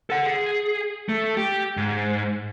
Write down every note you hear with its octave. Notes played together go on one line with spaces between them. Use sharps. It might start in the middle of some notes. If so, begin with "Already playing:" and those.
A4 F#5
G#4
A3
G4
G#2